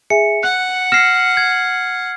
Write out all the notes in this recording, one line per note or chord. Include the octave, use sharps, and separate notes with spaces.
G#4 E5 G#5 C#7
F#5 F#6
F6 A#6 C7 C#7 E7
G#6